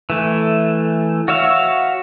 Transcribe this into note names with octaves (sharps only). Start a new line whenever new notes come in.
E3 A3
F#4 C#5 E5 F5